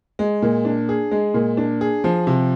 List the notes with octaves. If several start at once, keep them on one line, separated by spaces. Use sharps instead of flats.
G#3
A#2
D4
G#4
G#3
A#2
D4
G#4
F3
C3